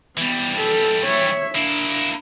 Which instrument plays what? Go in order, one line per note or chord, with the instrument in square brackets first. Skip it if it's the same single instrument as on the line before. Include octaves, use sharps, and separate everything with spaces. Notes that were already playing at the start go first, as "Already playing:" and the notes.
[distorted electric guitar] E3 G3 [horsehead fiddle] B3
[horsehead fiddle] A4
C#5 E5
[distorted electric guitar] A#3 E4 [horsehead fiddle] D4